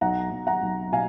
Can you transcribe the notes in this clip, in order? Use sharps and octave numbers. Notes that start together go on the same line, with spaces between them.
B1 F#5 A#5
B1
F#5 A#5
B1
B2 F5 G#5